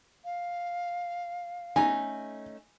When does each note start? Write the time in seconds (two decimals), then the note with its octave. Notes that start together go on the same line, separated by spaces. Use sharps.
0.24 F5
1.76 A3 C#4 D#4 G#5